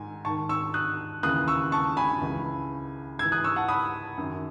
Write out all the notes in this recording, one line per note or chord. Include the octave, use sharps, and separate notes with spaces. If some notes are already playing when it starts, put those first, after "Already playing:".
Already playing: G#2 D#3 G#5
G#2 D#3 A5 C#6
C#6 E6
D#6 F#6
D#2 C#3 E3 D#6 F#6
C#6 E6
A5 C#6
G#5 B5
C#2 C#3 E3
G#2 E3 E6 G#6
D#6 F#6
C#6 E6
F#5 A5
B5 D#6
F#2 D#3